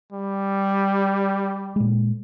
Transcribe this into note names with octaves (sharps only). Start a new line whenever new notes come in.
G3
A#2 G#3